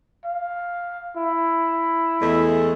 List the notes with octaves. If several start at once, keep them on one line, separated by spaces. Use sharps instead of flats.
F5
E4
E2 G#3 A3